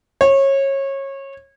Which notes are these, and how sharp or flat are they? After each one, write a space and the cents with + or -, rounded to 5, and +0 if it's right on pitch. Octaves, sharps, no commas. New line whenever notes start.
C#5 -25